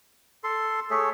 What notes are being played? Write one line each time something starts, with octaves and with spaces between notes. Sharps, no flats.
A4 C6
A3 G#4 C#5 E5